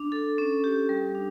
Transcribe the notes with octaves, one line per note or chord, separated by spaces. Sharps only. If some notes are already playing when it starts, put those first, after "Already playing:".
Already playing: D4
A4
C#4
G4
G3
D4